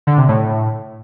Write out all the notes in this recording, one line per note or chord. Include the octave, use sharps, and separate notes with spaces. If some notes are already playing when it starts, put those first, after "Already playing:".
D3
C3
A2